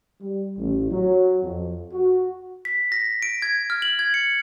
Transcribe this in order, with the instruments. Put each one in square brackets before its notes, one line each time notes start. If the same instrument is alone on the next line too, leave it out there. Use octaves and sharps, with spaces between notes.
[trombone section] G3
A1
F#3
F2
F#4
[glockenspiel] B6
A#6
D7
G#6
F6
F#7
G#6
C#7